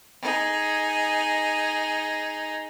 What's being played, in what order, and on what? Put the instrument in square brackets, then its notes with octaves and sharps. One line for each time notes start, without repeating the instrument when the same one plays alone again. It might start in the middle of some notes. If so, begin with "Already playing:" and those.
[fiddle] D#4 G#4